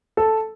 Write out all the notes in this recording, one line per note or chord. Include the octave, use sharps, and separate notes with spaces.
A4